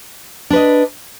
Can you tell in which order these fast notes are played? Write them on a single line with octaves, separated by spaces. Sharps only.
D4 B4 D#5